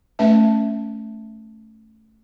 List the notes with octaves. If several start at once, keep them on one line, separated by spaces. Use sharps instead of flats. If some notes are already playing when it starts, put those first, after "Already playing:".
A3 C#4 B4 E5 A5